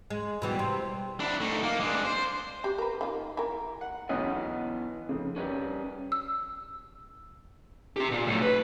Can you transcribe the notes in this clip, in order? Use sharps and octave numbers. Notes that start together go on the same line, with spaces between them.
G#3
B2 E3 G3
C3
D4 E4
A3 D#4
A#3
G#3 D4
C5
F#4 G4 D5
A#4 B4
D#3 A#3 F4
E3 A#4
F#5
B1 E3 B3 C#4 D#5 F#6
F2 C#3
G3 C#4 G4 B4
E6
C4 G4
A#2
B1 A2
B4